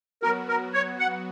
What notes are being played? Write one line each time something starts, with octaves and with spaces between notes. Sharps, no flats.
F#3 B3 F#4 A#4
A#4
C#5
F#5